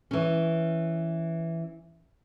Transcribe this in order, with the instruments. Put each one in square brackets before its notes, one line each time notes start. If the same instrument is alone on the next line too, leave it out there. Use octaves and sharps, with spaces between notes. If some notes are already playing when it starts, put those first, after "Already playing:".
[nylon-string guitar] E3 C#4